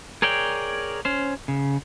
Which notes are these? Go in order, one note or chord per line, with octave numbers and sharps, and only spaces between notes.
G#4 A#4 C#5 D5 G5
C#4 C5
C#3